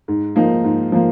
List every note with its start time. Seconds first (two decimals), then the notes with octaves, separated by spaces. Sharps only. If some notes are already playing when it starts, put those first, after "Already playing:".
0.08 G#2
0.36 F3 A#3 D#4
0.64 G#2
0.92 F3 A#3